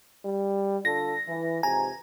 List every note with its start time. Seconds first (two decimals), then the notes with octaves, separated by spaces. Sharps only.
0.25 G3
0.85 D3 F4 A4 A#6
1.28 E3
1.63 F2 G#2 C3 G#5 A#5